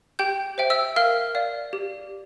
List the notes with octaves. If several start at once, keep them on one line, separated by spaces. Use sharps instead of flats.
G4 G5 G6
C5 E5 G5
E5 E6
A#4 F5 F6
D5 F5
G4